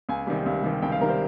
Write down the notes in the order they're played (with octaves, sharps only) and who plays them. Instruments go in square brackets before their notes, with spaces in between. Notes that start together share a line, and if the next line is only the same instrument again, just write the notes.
[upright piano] C#2 G#5
C3 D#3 G3
C#2
C3 D#3 G3
C#2 G5
F5
C3 D#3 G3 A#4
C5